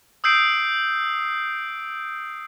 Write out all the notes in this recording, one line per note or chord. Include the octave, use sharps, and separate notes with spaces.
D#6 E6 G6 C7 D7